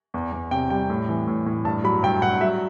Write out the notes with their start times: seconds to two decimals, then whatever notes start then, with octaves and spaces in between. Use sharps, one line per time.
0.14 E2
0.32 E2
0.51 C3 G5
0.70 G3 G5
0.90 A2
1.09 E3
1.27 A2
1.46 A2
1.65 G2 A5
1.84 F#3 B5
2.03 G2 G5
2.22 G2 F#5
2.41 F#3 E5